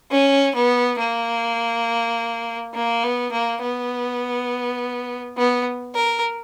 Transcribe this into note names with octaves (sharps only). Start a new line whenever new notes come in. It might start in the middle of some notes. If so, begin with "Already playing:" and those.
C#4
B3
A#3
A#3
B3
A#3
B3
B3
A#4